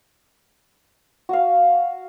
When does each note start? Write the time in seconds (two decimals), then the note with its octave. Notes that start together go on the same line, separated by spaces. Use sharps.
1.29 F#4 F5